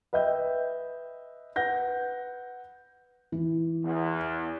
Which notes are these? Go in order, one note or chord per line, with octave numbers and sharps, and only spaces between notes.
B4 D#5 E5 G5 G6
B4 F#5 G6 A#6
E3
E2